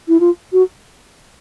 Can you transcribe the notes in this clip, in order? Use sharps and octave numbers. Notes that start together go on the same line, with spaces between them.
E4
F4
F#4